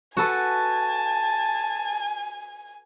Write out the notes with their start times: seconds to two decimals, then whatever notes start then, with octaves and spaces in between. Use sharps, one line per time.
0.17 F#4 A4 B4 G#5 A5